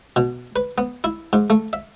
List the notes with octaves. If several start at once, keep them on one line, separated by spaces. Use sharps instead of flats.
B2
B4
B3
E4
G#2
A3
E5